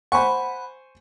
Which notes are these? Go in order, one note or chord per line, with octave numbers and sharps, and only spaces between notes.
C5 F#5 G#5 B5 C#6